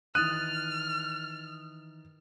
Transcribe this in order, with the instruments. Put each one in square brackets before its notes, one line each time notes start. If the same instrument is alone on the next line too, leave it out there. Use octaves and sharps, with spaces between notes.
[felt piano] D#3 E3 [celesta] D#6 A6 [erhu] F6 [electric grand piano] F#6 D#7